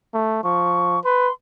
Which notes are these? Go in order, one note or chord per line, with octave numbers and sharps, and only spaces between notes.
A3
F3 C#6
B4 C6